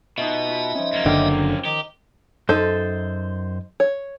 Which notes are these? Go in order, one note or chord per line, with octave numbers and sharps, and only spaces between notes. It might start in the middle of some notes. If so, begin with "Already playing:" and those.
B2 D#4 F4 D#5 E5
F4 B5
F3 C#4
F#2 A#3
F#1 D3 G5 D6 F6
D#3 G4
F#2 D#4 A4 C5
C#5